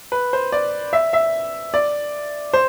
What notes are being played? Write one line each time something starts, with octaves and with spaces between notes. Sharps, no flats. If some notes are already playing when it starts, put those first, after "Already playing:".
B4
C5
D5
E5
E5
D5
C5